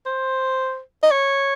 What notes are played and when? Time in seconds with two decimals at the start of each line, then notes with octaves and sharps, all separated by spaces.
0.06 C5
1.03 D#5
1.11 C#5